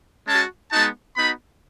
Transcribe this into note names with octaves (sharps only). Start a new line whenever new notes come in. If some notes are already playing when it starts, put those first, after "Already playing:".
G#3 C#4 F#4 A5
G#3 B3 D#4 F#4 A5
B3 D#4 F#4 B5